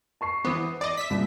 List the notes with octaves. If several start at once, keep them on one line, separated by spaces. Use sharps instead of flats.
A5 C#6 C7
E3 B3 C5 D6 D#6
D5 D#5 D6
E5 B6
C2 A#2